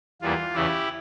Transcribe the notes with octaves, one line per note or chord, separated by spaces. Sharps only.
E2 E3 G3 A#3 F4
E2 C#3 E3 E4 G4